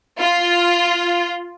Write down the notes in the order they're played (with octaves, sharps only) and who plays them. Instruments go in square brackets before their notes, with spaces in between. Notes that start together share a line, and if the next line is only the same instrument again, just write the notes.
[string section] F4